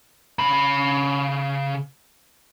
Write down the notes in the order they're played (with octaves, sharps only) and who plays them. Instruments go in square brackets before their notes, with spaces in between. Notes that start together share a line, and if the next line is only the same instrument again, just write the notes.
[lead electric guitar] C#3 B5